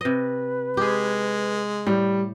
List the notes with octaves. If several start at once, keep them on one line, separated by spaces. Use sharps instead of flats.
C3 B4 D#5
G#3 G4 G#4
A2 G3